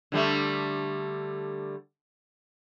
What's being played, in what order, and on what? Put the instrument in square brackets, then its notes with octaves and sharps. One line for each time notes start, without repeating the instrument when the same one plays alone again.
[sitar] D3 G3 A3